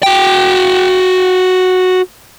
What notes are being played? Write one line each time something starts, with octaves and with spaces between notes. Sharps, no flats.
F#4 G5